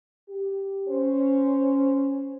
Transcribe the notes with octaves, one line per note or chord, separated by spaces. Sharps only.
G4
C#4 C5